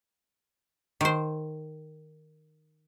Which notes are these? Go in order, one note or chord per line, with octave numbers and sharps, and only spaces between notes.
D#3 C5